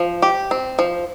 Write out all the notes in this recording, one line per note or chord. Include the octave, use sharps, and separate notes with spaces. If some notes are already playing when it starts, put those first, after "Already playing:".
Already playing: F3
G4
C4
F3